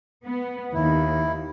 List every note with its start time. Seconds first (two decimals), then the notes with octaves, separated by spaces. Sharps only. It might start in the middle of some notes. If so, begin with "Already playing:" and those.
0.25 B3
0.74 D#2 E4